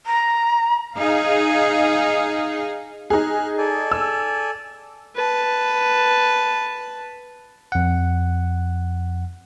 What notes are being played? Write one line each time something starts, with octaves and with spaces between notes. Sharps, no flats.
A#5
D#4 G#4 F5
D#4 G#4 F6 F#6
A4 D5 G#5
E6
B4 A5
F2 F#5